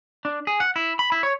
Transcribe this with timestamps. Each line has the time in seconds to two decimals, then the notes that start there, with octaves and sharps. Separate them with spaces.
0.25 D4
0.47 G#4
0.60 F#5
0.76 E4
0.99 B5
1.12 E4
1.23 C#5